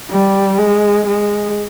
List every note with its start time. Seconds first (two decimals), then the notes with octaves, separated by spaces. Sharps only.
0.11 G3
0.58 G#3
1.07 G#3